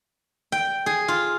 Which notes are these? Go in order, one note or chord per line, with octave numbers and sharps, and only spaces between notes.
G5
G#4
F4